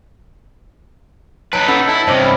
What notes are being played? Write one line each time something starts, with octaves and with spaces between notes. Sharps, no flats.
F#3 D#4 B4 A5 F#6 D7
C#4 A4 F#5 B5 B6
E4 A5 E6
G2 C3 C5 C#5 D#5 D6
C#4 B5